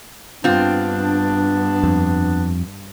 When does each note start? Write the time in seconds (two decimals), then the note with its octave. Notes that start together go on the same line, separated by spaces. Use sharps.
0.44 G2 B3 C4 D4 F4
1.84 F2